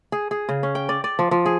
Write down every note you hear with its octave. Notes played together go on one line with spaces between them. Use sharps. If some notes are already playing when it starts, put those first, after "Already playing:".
G#4
G#4
C#3
C#4
G5
D5
D5
F3
F3
G#4